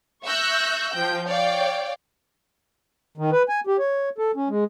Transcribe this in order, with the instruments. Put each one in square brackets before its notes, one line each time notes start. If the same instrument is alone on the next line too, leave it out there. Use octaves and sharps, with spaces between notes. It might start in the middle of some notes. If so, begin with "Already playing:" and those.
[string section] E5 C#6 E6 F#6 G6 A#6
F3 G5 G6
C#5 D5 F5 G5
[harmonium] D#3
B4
G#5
G4
C#5
A4
C#4
G#3